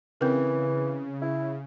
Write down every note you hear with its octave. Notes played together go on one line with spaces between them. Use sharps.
C#3 E3 C4 A#4
E4